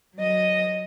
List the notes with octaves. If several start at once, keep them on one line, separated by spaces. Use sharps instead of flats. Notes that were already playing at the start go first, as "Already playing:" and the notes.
F#3 D#5